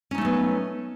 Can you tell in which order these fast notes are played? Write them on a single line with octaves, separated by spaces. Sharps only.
C#4 D#4 A3 F#3 B3